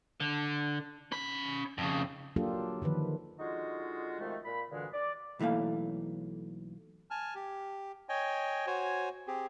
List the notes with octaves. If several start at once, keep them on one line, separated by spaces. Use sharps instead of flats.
D3
C#4 B5
F2 C#3
F#3 A#3 D4 F4 G4 A4
D3 D#3 F3 B4
D3 G#3 D#4 F4 F#4
C3 D#3 F3 G#3 A3
A#2 B5
D2 G2 A#2 D3 E3 G#3
D5
B1 E3 A3 A#3 F5
G#5 A5 F6
G4
C#5 D#5 G5 G#5
F#4 C5 C#5 G#5
C4 G4 G#4